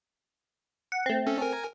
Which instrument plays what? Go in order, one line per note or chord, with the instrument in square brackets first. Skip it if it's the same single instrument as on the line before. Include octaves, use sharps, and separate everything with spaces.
[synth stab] F#5
A3 C4
[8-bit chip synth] C#4 A4
A#4 G#5